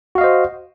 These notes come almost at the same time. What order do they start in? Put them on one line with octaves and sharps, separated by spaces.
F#4 F5 D#5 C5